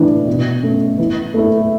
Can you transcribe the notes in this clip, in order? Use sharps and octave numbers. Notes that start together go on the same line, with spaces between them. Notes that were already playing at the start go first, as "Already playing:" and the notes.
Already playing: A2 E3 A3 D4
B2
A3 C#4
E3
A3 E4 A4